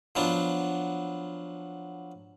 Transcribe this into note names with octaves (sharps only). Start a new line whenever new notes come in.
F3 F#3 B3 D4